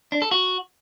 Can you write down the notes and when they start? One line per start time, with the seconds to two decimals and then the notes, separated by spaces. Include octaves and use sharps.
0.12 D4
0.22 A4
0.31 F#4